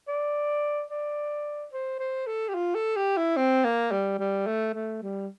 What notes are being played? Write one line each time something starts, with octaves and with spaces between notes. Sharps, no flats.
D5
D5
C5
C5
A4
G4
F4
A4
G4
E4
C4
A#3
G3
G3
A3
A3
G3